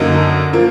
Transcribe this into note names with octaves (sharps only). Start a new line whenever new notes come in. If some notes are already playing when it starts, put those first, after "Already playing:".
Already playing: F#2 D3 F#3 A#3 D#4
F3 A#3